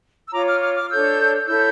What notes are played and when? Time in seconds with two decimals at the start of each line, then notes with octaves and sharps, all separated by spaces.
0.27 E6
0.32 F4 C#5 A#5 D6
0.46 D6 F6
0.61 D6 F6
0.75 D6 F6
0.89 D4 A4 C#5 E6 G6
1.46 E4 A4 C#5 E6 G6